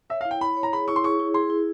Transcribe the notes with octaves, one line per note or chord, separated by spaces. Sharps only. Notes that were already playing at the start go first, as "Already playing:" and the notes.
C#5 E5
F5
E4
G5
E4 B5
C#5
A#5
G#4 B5
E4 C#6
C6
G#4 C#6
E4
G#4 C6
E4